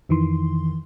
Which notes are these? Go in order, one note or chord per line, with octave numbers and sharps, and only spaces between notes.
F2 D#3 E3 C6